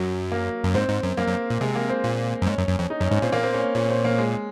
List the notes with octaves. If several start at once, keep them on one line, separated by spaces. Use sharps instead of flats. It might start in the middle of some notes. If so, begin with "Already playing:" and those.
Already playing: F#2 F#3
A#3
F#2
G#2 C4
G#2
F#2
F#2 A#3
F#2
A#2
C3 G#3
A#3
C4
A#2
F#2
G#2 C#4
F#2
F#2
F2
D#4
F#2 C#4
G#2 C#4
A#2 C4
A#2 A#3
C4
C#4
A#2 C#4
C4
A#3
G#3